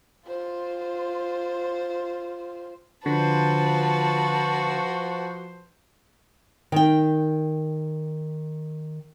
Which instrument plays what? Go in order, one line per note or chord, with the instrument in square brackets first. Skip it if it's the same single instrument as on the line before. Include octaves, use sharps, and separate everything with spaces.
[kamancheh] F4 C5
[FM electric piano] D3 [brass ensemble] F3 C5 [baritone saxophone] F#4 [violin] B4 A5
[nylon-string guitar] D#3 G5